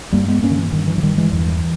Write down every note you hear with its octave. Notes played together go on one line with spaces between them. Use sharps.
G2 G3 A#3
G#3 B3
G2 A#3 C#4
D#3
E3
G2 D#3
E3
E3
G2 D#3 G3
E3 G#3
E2 E3